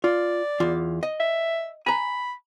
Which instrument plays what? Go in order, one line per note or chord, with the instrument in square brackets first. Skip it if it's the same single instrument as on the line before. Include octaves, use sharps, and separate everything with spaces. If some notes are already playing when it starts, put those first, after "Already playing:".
[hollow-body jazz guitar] F4 [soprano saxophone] D5
[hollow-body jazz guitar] E2 F4
D#5
[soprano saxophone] E5
[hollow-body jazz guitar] G#5 A#5 [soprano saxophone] B5